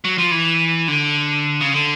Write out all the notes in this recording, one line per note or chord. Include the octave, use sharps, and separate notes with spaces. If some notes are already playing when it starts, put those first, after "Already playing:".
F#3
F3
E3
D3
C#3
D3